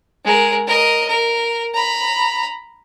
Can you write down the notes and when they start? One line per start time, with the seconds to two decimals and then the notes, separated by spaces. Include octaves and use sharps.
0.25 G#3 A#4
0.67 A#4 D#5
1.08 A#4
1.74 A#5 B5